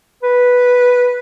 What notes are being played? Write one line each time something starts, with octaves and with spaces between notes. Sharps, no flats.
B4